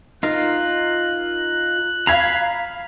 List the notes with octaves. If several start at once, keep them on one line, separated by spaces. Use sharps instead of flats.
D#4 F4 A#4 F#6
F5 A#5 B5 G#6 C7